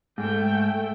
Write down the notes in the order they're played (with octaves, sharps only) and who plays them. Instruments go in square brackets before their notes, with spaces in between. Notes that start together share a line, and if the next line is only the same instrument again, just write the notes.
[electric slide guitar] G#2 [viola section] A3 G5